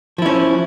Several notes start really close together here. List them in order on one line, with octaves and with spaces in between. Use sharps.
F3 E4 C#4